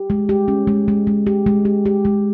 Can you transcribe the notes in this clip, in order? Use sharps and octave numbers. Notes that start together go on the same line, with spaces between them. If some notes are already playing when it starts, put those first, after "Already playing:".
Already playing: G4
G#3
G4
C#4
G#3
G#3
G#3
G4
G#3
G4
G4
G#3